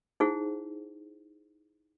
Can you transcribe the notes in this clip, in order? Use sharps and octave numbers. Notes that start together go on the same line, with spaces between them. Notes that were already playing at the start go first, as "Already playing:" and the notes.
D#4 E4 G#4 C5 F#5